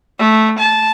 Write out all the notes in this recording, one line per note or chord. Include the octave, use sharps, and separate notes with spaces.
A3
A5